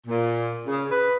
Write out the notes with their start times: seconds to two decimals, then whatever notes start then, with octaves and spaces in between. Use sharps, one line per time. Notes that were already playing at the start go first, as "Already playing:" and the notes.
0.07 A#2
0.67 C#3
0.91 B4